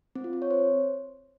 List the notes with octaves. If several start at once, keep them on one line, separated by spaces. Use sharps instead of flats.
C4
F4
C4
C#5
C5